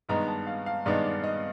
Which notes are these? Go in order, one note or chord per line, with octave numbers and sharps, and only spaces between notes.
G2 D#3 G#3 B3 D#4 A#5
A5
F5
F5
G2 D#3 G#3 B3 D#4 D5
D5
D#5